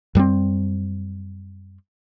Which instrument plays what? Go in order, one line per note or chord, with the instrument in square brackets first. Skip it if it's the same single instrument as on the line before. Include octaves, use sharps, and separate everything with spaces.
[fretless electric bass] F#2 G3 G#3 C4